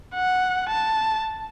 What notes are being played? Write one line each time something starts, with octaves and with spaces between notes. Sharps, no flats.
F#5
A5